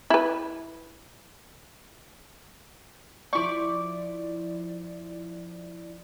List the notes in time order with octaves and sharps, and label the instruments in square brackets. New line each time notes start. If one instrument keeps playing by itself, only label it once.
[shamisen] E4 B4
[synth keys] F3 E4 D5 [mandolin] C#6 D6